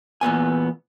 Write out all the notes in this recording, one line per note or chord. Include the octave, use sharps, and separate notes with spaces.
E2 A#2 B3 G#5